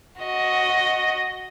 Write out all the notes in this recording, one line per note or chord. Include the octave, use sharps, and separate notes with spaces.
F#4 D#5